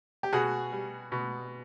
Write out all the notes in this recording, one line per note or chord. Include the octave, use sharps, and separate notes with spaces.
G4
B2 F#4 G#4
G3
B2